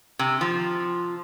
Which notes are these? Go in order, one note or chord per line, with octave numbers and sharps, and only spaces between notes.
C3
F3